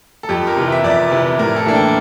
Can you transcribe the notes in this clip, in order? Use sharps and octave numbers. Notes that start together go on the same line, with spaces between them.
A4
F2 G4
A#4
C3 E3
E5
F2 D5
C3 E3
A2 A#4
A4
E3 A#3 D4
G5